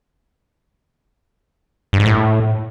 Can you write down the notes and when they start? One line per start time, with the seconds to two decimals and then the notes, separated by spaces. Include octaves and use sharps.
1.93 G2
1.99 G#2
2.06 A2